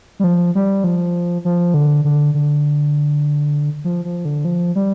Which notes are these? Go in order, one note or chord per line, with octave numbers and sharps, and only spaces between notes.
G3
F3
G3
F3
F3
D3
D3
D3
F3
F3
D3
F3
G3